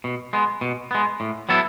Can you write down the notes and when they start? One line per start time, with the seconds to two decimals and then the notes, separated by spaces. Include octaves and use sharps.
0.04 B2
0.33 G#3 B3
0.61 B2
0.91 G#3 B3
1.20 A2
1.49 F#3 B3 E4 A4